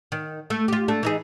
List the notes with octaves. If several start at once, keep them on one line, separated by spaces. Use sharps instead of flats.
D#3
A3
F4 G4
A3 D4
E3 D#4 G#4